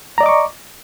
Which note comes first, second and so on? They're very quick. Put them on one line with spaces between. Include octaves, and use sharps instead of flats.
A#5 D5 D#5 D6 C#6